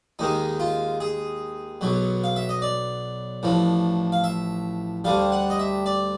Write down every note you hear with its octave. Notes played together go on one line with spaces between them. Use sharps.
D#2 D#3 G#3 D#4
F4
G#4
B1 B2 F#3
F5
E5
D#5
D5
A1 A2 F3
F5
E5
D2 D3 G3 F5
F#5
D#5
E5
D5